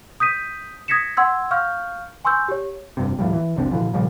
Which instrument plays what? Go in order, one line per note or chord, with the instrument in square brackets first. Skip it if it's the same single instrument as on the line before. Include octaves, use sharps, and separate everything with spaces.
[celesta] D#6 G6 B6 D#7
D#6 G#6 A#6 B6 C#7 E7
F#5 C6 E6 G#6
F5 C#6 F6 G6
G#5 C6 C#6 E6 G6
G4 C#5
[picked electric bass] F1 G2 C3
D#2 A2 F3 G3
E3
F1 C2 D3 C4
A#2 D3 E3 F3
A#2 C#3 F3 G3